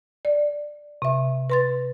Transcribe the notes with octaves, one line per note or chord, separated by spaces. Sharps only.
D5
C3 E5
B4 C6 A6